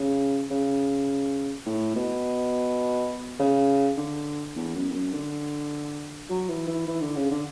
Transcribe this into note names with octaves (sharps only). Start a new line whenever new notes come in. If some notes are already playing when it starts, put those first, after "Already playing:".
Already playing: C#3
C#3
A2
B2
C#3
D3
E2
F#2
E2
F#2
D3
F#3
E3
E3
E3
D3
C#3
D3